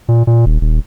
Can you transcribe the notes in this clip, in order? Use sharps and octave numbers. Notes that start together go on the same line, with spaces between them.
A#2
A#2
D#1
D#1